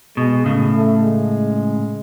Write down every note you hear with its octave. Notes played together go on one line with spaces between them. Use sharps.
B2 G#3
A2 C#3
A3
G#3